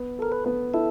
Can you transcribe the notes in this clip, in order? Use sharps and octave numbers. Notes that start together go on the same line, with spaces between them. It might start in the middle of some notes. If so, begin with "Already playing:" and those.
Already playing: B3
A4 A#4
B4
B3
E4 A4